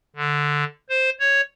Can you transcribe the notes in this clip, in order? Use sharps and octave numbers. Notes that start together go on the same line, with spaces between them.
D3
C5
C#5